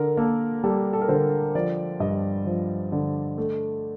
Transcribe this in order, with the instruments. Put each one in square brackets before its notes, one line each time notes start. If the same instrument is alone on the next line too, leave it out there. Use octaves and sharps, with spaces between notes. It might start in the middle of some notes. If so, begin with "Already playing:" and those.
Already playing: [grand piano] D3 [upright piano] A#4
[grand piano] A#3 [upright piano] A4
[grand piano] G3 [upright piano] A4
[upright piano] A4
A#4
[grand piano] D3 [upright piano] C5
[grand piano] F3 [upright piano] D5
[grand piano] G2 [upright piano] D#5
[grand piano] F3
D3
A3